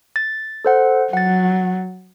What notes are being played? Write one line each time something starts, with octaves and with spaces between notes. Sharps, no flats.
A6
A4 C5 F#5
F#3 F#5 A6